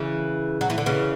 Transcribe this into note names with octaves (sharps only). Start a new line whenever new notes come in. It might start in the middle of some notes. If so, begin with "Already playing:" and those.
Already playing: C#3 E3
F#3
E3
D3
C#3 E3